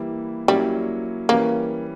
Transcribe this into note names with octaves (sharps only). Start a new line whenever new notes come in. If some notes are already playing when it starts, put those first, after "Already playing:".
Already playing: E3 G3 A#3 E4
F#3 G3 A#3 C#4 E4
E3 G3 A#3 C#4